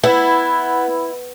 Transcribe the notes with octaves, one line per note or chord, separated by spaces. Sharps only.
B3 E4